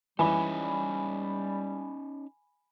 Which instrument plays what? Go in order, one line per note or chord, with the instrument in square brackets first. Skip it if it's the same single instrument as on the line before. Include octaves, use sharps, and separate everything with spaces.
[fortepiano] E3 [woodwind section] G3 [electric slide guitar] C#4 D#4 [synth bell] G#5 B5